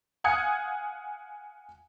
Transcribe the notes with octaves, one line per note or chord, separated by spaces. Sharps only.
F5 F#5 G#5 D#6 G#6 C#7